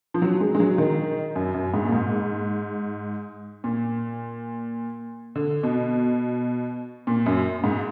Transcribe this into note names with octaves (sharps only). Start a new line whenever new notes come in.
F3
F#3
G#3
G#3
F#3
D#3
F#2
F#2
G#2
A#2
G#2
A#2
D3
B2
A#2
F#2
G#2